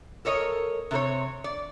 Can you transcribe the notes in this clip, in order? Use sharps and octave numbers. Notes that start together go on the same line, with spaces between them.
A4 A#4 C#5 D#5
C3 C4 A#4 C#5
D5